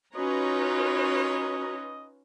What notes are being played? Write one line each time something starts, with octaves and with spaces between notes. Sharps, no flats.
C#4 D#4 F4 F#4 B4 C#5 D#5 A#5